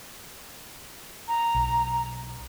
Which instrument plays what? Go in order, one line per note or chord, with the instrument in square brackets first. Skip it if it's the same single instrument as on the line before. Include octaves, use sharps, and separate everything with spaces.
[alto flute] A#5
[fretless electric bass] B1